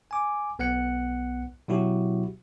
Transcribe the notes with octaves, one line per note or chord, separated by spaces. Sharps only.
G#5 D6
B1 B3 F#5 F#6 C#7
B2 F#3 E4 F#4 G4